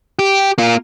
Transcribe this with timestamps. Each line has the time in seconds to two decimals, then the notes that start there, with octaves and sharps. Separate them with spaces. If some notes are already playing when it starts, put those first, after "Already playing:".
0.19 G4
0.58 A#3 F4